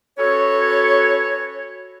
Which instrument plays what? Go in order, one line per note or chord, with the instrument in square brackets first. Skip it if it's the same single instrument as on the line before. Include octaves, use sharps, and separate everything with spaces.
[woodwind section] C#4 F#4 A4 B4 C#5